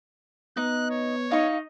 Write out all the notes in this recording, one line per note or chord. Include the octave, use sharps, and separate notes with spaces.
B3 D#4 D#5 F#6
C#5
D#4 F5 C#6